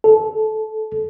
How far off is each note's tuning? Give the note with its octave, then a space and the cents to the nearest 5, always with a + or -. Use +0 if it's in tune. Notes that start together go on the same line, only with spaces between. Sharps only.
A4 -20